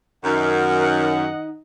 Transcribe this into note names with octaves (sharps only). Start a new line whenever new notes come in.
F#2 D#3 D#4 A#4 D#5 F#5